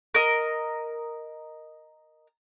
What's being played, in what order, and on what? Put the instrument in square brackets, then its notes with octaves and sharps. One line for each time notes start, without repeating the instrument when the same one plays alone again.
[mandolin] A#4 D#5